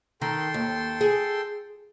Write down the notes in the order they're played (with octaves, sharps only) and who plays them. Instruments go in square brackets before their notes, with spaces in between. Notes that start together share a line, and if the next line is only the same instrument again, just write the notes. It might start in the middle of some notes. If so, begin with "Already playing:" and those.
[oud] D#3 [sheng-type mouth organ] A4 G5 C6
[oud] D#2
G#4